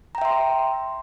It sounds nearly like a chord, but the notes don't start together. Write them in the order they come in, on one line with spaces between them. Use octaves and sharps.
A#5 G5 E5 C6